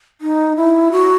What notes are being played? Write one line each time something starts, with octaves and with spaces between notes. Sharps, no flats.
D#4
E4
F#4